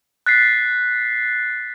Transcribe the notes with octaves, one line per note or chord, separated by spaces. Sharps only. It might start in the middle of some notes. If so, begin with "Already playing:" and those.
F#6 A6 B6 C7